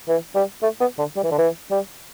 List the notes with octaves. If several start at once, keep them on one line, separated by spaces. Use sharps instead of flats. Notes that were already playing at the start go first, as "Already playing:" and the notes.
E3
G3
A3
B3
D3
G3
E3
D3
E3
G3